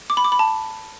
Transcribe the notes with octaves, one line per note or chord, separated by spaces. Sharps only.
D6
B5
D6
B5
A5